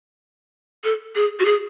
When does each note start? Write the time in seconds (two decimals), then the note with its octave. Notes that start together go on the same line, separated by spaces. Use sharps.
0.84 A4
1.16 G#4
1.40 F#4
1.45 G#4